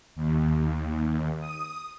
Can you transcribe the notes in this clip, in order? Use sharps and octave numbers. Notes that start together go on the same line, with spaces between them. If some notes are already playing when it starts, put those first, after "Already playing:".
D#2
D#6